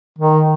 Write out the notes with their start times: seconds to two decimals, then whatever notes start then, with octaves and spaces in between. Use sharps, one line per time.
0.18 D#3